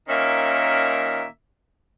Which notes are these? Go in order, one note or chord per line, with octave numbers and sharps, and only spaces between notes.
A#2 D#3 A#3 C#4 E5